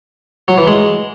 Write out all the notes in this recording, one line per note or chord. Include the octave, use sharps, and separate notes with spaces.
F#3
E3
G#3